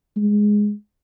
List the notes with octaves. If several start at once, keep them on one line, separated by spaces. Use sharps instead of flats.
G#3